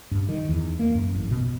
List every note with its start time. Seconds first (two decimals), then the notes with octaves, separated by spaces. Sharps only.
0.11 G2
0.29 D#3
0.48 E2
0.79 A#3
0.95 F#2
1.15 A1
1.31 B2